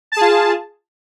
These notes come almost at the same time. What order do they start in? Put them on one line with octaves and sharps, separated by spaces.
A5 G#4 F4